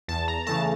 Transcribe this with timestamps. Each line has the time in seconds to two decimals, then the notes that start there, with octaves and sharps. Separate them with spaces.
0.08 E2 A5
0.28 A#5
0.47 C#3 E3 A3 A5